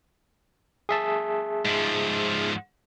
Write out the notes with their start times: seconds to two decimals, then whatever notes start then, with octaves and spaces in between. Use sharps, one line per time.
0.89 G#4 E5 A5
1.65 G#2 F3